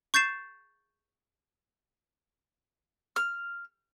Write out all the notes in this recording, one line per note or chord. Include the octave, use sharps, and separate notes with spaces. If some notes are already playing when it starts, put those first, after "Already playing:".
C#6 G6 A6 C7 E7
F6